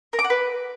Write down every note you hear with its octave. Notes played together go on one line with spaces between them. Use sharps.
A#4
D6
F#5
B4